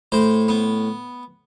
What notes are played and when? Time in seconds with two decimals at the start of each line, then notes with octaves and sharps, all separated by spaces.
0.12 A2 C5
0.48 B3